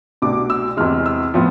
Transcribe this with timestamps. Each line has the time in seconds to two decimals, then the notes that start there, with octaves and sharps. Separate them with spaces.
0.22 C2 B2 A3 D4 D6
0.50 E6
0.77 E2 C3 E3 G#3 F6
1.06 E6
1.34 A2 F3 B3